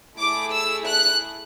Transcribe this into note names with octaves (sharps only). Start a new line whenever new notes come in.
A3 E4 G#4 D6
E6
F#6